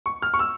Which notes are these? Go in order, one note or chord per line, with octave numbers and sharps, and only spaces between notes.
C#6
F6
C#6
E6